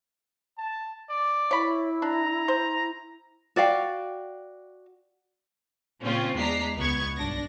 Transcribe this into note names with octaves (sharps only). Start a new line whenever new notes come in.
A5
D5
E4 C#5 B5
D4 A#5
C5
F#4 D5 F5 G5
A#2 C#3 C4 C#4 F4
E2 G#3 D4 A#5 B6 C7
C#2 B3 C#6 G#6
B1 G2 D4 A#6